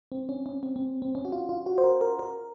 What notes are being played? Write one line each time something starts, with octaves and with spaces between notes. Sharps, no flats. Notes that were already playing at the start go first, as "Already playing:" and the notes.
C4
C#4
C#4
C4
C4
C4
C#4
F#4
F4
F4
F#4
C5
A#4
A#4
A#4